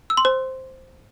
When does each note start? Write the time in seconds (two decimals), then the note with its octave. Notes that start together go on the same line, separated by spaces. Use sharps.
0.10 E6
0.17 C6
0.25 C5